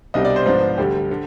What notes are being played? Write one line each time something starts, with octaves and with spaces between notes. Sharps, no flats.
C2 B2 G3 D4 D#5
D5
C5
G#2 F3 B3 D4
D2 D3 G3 G4
D3